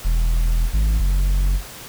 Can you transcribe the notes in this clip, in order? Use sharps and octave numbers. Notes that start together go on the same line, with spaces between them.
E1
G#1
F#1